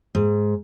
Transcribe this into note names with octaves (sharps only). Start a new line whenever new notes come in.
G#2